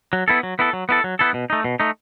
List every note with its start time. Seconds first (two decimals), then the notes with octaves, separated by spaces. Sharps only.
0.13 F#3
0.28 B3 E4 A4
0.43 F#3
0.59 B3 E4 A4
0.73 F#3
0.89 B3 E4 A4
1.04 F#3
1.19 B3 E4 A4
1.34 B2
1.50 A3 D#4
1.64 B2
1.80 A3 D#4